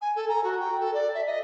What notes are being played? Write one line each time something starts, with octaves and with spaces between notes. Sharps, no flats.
G#5
A4
A#5
F#4
G5
A4
D5
E5
D#5